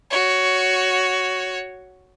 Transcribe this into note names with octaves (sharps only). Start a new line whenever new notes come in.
F#4 C#5